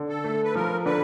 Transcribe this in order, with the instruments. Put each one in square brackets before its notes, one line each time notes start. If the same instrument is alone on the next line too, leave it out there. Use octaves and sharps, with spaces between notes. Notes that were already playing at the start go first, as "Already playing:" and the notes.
Already playing: [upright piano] D3
[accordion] A4
[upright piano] A3
[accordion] B4
[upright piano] F3 [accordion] A#4
[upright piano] D3 [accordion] B4